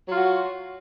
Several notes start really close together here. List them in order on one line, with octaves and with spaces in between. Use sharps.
F#3 F4 F#4